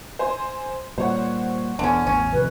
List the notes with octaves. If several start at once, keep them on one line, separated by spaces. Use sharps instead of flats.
C5 G#5 C6
A#2 G3 C5 C#5 F#5
E1 E2 D3 C#4
A1 E2 C#4
F2 C3 D#3 B4